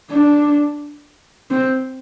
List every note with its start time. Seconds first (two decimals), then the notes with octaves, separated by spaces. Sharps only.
0.11 D4
1.51 C4